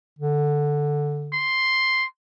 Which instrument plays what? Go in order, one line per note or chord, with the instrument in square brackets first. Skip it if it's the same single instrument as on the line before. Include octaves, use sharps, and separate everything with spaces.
[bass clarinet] D3
[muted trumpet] C6